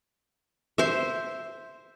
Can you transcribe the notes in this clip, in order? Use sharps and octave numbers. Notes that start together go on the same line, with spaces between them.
C5 E5